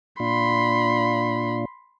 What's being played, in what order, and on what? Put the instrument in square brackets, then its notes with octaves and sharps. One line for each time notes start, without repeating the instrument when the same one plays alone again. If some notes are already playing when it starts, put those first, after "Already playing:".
[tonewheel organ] A#2 D4 F4 [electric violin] B5 C6